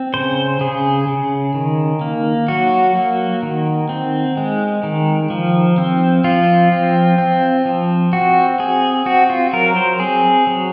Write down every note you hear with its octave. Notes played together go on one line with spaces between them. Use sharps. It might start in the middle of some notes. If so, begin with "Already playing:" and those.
Already playing: C4
C#3 C5
C#3 G#4
C#3
D#3
A#3
F#3 F#4
A#3
D#3
C4
G#3
D#3
F3
C4
F3 F4
C4
C4
F3
C4 F#4
C4 G#4
C4 F#4
F4
F#3 A#4
C5
C4 G#4
F#3